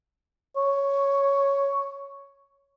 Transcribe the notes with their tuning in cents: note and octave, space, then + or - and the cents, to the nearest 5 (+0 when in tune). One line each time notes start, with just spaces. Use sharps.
C#5 +5